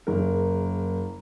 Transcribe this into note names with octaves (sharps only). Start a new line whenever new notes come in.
F#1 A#4